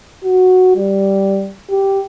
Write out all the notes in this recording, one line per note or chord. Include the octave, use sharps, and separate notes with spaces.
F#4
G3
G4